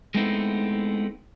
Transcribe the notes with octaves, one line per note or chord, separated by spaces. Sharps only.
G#3 A3 B3 C4 D#4 E4